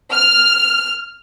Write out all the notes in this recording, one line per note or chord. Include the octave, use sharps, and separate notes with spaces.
F6